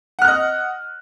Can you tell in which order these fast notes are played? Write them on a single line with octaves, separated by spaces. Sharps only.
F#5 F6 F#6 D#5